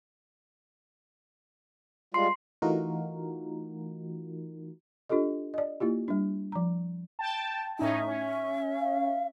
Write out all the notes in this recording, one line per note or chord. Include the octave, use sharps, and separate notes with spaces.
G3 G#3 F4 C6 C7
E3 A3 D#4 F4 F#4 A#4
D4 F4 G4 A4 D#5
D5 D#5
A#3 E4 F4 G4
G3 D4
F3 A#5
G5 A5
A2 C#4 D#4 E5
C#4
F5